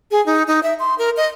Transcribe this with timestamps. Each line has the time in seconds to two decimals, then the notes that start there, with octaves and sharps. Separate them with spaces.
0.11 G#4
0.26 D#4
0.47 D#4
0.63 E5
0.80 C6
0.98 A#4
1.17 D#5